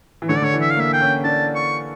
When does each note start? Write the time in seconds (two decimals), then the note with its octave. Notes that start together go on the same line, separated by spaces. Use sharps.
0.22 E3
0.29 D3 C#5
0.37 D5
0.42 D3 C#5
0.54 E3
0.62 E5
0.71 F5
0.77 A#3 E5
0.93 G5
1.01 C#4
1.24 D4 A5
1.55 C#6